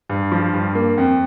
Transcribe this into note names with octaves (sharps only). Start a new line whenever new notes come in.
G2
F3
G2
A#3
F2